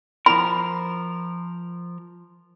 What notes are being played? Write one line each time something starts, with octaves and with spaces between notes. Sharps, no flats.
F3 A#4 B5